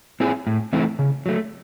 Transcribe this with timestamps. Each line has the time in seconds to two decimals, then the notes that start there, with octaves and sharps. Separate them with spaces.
0.20 C4 E4 G#4
0.47 A2
0.73 E3 A3 C4 E4
0.99 C#3
1.26 F#3 A3